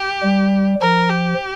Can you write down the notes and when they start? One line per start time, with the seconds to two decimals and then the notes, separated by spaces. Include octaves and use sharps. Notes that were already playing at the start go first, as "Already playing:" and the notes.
Already playing: G4
0.23 G3
0.81 F3 A#4
1.10 G4